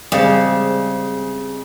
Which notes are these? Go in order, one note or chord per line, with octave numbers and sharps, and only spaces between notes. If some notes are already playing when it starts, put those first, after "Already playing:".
C#3 G3 G#3 C4